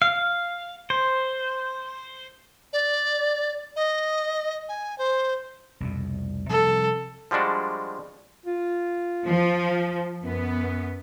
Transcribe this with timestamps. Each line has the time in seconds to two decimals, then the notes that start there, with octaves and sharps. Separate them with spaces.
0.02 F5
0.90 C5
2.73 D5
3.76 D#5
4.69 G#5
4.98 C5
5.80 C2 F2 B2
6.49 C3 F3 G3 A4
7.31 F3 G3 G#3 D4 F#4
8.46 F4
9.27 F3
10.23 F#2 B3